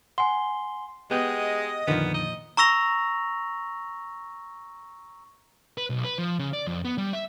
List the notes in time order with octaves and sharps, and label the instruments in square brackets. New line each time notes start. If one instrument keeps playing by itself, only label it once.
[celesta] F#5 G#5 [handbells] C6
[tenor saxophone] G#3 [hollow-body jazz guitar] B3 [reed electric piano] G4 F#5 G5 [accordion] D#5 D#6
[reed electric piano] F2 D3 D#3 [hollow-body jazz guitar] A#2 F3 [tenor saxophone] B3
[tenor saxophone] D#5
[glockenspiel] A#5 C#6 E6 A#6 F7
[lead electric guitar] B4
B1
B4
F3
C#3
D5
F2
B3
G3
E5